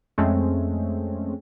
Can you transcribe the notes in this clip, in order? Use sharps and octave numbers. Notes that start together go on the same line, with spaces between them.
F2 G#3 A3 C4 C#4